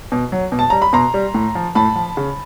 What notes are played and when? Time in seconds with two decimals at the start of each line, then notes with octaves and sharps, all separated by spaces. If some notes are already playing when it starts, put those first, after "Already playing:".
0.12 B2
0.32 F#3
0.52 B2
0.59 A5
0.70 G3 A#5
0.82 B5
0.93 B2 A#5 C6
1.14 G3
1.34 A2
1.55 F3
1.75 A2 A5 B5
1.96 F3
2.17 C#3